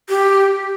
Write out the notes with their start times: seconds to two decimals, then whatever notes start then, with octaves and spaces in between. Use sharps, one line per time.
0.09 G4